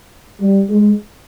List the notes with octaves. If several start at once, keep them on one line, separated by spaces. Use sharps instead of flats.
G3
G#3